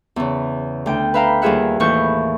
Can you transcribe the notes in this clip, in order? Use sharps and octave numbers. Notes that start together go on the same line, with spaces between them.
E2 C#3
D2 G5
B4 E5 F5 G5 A#5
D#2 G3 F4 G#4 E5 F#5
D#2 A2 E3 B4 C#6 G6